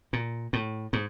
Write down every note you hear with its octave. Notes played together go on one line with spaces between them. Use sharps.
A#2
A2
G#2